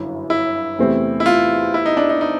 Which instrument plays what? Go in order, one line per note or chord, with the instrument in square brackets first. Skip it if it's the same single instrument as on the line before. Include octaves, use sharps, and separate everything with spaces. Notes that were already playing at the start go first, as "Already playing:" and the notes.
Already playing: [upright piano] G1 F#2 E3
[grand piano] E4
[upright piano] E2 C3 E3 A3 C4
[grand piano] E4
F4
E4
D#4
D4
D#4
D#4